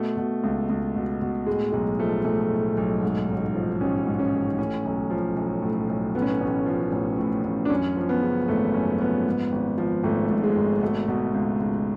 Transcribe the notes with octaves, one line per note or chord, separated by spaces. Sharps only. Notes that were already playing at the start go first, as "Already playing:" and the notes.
Already playing: B2 A3
B2
C#2
C#2
B2
B2
A2 G#3
B1 G#3
F3 A3
B1 A3
A2
B1
G#2
A1
F3
A1 C#4
G#2
C#4
A1
A2 C#4
B1
F3
B1
A2
B1
A2 B3
C#4
B3
A1
F3
A1
A2
A1
D4
F#2 C#4
F3
B3
C#3
G#1 A3
F#2 C#4
F3 B3
G#2
G#1
F3
G#1 A3
G#2
G#3
G#1
B2 A3
B2
C#2
C#2